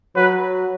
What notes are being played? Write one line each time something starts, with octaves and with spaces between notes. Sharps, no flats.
F#3 B4